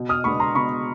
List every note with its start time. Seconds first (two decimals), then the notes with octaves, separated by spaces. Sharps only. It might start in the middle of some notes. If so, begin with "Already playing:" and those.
Already playing: B2
0.09 D#6 F6
0.24 G#3 B3 D4 B5 C#6
0.40 A#5 C6
0.55 B2 B5 C#6